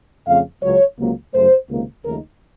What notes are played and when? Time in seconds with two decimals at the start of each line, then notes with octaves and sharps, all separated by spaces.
0.27 F2 C#3 A3 C4 F5
0.63 C#2 C#3 F#3 C#5
0.98 C#2 C3 F#3 A#3
1.34 F#2 C#3 A3 C5
1.70 C#2 C3 D#3 A#3
2.05 D#2 C#3 F3 A3 D#4 A#4